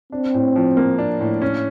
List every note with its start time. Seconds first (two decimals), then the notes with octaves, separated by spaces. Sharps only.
0.12 C4 D4
0.34 A2
0.56 F3
0.77 A#3
0.98 D4
1.21 A2
1.42 C#4